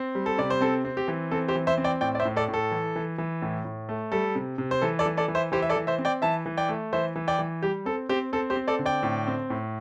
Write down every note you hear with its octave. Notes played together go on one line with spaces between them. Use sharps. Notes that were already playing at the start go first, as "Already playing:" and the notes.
Already playing: C4
G3
A4
C3 D5
C5
C4 A4
C4
G4
E3
C4 A4
G4 C5
E3
C5 E5
C4
D5 G5
A2 D5 G5
D5
C5 E5
A2
A4 D5
A2
A4
E3
E3
E3
A2
A2
A3
G3 A4
C3
C3
C5
E3 A4
A4 D5
E3
A4 D5
E3
C5 E5
E3 G4 C5
E5
A4 D5
E3
C5 E5
C4
D5 G5
E3 E5 A5
E3
D5 G5
A3
E3 C5 E5
E3
D5 G5
E3
G3 G4
C4 A4
C4 G4 C5
C4 A4
G4 C5
C4
A4 D5
D3
D5 G5
A2
C4
A2